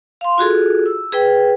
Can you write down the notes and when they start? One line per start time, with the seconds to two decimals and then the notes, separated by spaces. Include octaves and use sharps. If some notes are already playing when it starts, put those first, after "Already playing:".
0.21 F5 C6
0.38 F4 F#4 G#4 A4
0.86 E6
1.12 G#4 B4 G5